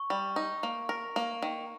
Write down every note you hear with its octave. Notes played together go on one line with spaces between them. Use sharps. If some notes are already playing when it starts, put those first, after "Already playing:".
Already playing: C#6
G3
D#4
A#3
A#4
A#3
D#3